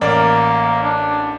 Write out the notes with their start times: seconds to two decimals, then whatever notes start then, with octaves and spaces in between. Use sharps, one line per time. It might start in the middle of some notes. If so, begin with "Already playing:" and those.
0.01 A1 A#3 A#4 D5
0.83 D4